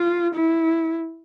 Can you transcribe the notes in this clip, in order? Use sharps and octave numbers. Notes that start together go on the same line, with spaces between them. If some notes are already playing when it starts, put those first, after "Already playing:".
Already playing: F4
E4